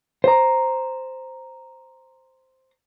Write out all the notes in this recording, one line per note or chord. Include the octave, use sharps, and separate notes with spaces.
C5 A#5